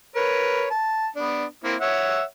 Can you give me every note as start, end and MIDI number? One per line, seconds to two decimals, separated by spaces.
0.16 0.68 70
0.16 0.68 71
0.16 0.68 73
0.70 1.07 81
1.16 1.45 59
1.16 1.45 62
1.64 1.75 58
1.64 1.75 60
1.64 1.75 64
1.81 2.23 73
1.81 2.23 76
1.81 2.23 78